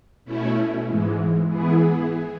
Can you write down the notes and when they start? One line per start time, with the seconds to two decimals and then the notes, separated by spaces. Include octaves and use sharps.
0.25 B2 A3 C#4 E4
0.86 G#2 E3 G#3
1.48 E3 B3 E4 G#4